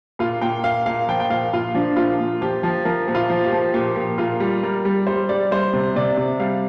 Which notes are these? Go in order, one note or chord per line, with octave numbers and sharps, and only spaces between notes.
A#2 F4
A#2 G5
A#2 F5
A#2 F5
F3 G5
G5
A#2 F5
A#2 F4
F3 D4
A#2 F4
A#2
F3 G4
F3
F3 A#4
A#2
F4
F3
G4
F3
A#2 G4
A#2
A#2 F4
G3
G3 A#4
G3
G3 C5
G3 D5
G3 C5
C3
C3 D5
C3
G3 F5